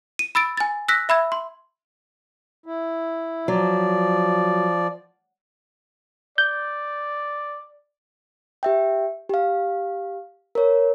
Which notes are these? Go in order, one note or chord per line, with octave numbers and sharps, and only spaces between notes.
D#7
B5 E6 A6 D7
G#5 A6
E6 F#6 A#6 B6
E5 B5 E6 G#6
C6
E4
F3 F#3 D5
D5 G6
G4 E5 G5
G4 F5
A#4 C#5